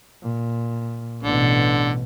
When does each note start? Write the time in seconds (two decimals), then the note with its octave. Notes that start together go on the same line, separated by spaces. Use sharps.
0.23 A#2
1.23 A1 B2 D3